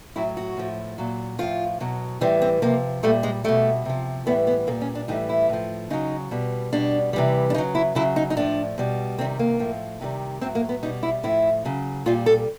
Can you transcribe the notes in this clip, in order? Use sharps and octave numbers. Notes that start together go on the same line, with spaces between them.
A2 F#3 E4
F#4
A2 F3
A#2 F#3
A2 F3 F4
B2 F#3
A2 E3 G3 C4
C4
C3 F3 A#3
A#2 G3 A3
G#3
B2 G3 A3
C3 F3
A2 E3 G3 B3
B3
A#2 G3 A#3
C#4
D4
A2 E3 G3 D#4
E4
A2 F3
C#3 F#3 D#4
B2 G3
B2 G3 D4
C3 E3 G3
D4
C#3 F#3 D#4
E4
C#3 F#3 E4
D#4
D#4
A2 F3 D4
B2 G3
C3 D#3 G3 C4
A#3
A2 F3
C3 D#3 G3
A2 F#3 C4
A#3
B3
B2 G3 D#4
E4
A2 F3 E4
C#3 F#3
A#2 G3 F4
A4